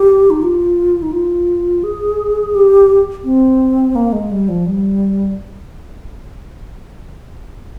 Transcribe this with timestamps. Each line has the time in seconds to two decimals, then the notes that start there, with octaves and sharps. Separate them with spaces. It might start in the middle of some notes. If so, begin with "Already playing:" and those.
Already playing: G4
0.30 D#4
0.42 F4
1.02 D#4
1.12 F4
1.84 G#4
2.55 G4
3.24 C4
3.95 A#3
4.12 G#3
4.31 G3
4.49 F3
4.66 G3